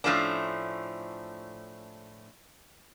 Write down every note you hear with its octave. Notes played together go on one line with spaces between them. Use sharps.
A2 F3 A3 C#4 D4